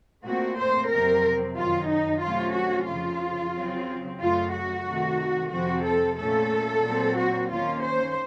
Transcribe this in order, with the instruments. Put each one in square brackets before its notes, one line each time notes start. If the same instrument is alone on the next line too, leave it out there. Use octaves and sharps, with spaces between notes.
[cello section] A#2 A3 C4 F#4
C5
F2 C3 F#3 C4 A#4
F#2 D#3 F#3 F4
D#4
C3 F#3 A3 C#4 F4
F#4
F2 C#3 F3 F4
C#3 F#3 C4
F#2 C#3 A3 F4
F#4
C3 D#3 A3
F2 C3 F3 C4 F#4
A4
A#2 A3 C#4 A4
A#2 F#3 C4
F#4
D#2 D#3 A#3 C#4 F4
C5